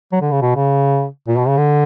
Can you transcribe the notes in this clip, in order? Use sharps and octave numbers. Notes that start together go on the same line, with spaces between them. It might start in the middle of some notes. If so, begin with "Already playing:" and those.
F#3
D3
C#3
B2
C#3
A#2
B2
C#3
D3